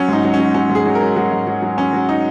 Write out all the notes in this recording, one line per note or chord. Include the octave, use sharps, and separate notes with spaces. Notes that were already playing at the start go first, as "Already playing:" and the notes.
Already playing: F#3 C#4
G#2 D#4
F#3
C#4
F#3
F#3 C#4
G#2
G#4
F#3
A#4
F#3
F#3 A#4
G#2
F#3
F#3
F#3 C#4
F#3
D#4